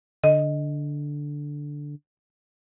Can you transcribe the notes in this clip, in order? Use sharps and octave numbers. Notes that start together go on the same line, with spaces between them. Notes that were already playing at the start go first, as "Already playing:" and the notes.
D3 D#5